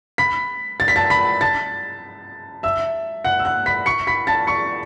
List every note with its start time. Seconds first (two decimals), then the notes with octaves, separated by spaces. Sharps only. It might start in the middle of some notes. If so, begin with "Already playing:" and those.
0.18 B5 B6
0.80 A6
0.88 B6
0.96 A5 A6
1.10 B5 B6
1.41 A5 A6
2.63 E5 E6
3.25 F#5 F#6
3.39 E6
3.45 F#5 F#6
3.66 B5 B6
3.86 C#6 C#7
4.07 B5 B6
4.27 A5 A6
4.47 C#6 C#7